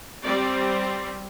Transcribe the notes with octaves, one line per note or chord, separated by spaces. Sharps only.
G3 C4 D5